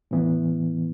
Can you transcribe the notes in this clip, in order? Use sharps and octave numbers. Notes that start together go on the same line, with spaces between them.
A2 E3 B3